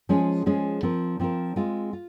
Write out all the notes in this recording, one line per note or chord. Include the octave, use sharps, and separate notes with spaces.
F3 G#3 C#4 G#4
F3 G#3 C#4 G#4
F3 C4 F4 A#4
F3 C4 F4 A#4
G#3 C4 F4
F4